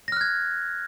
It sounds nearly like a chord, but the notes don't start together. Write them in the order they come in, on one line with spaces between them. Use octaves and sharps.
A#6 F6 F#6 G#6